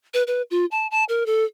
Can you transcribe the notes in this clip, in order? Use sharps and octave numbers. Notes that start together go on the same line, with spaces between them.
B4
B4
F4
A5
A5
A#4
A4